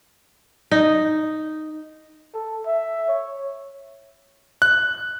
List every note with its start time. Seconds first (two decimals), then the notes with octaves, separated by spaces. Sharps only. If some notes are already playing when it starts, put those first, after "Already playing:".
0.71 D#4
2.34 A4
2.67 E5
3.09 C#5
4.62 F#6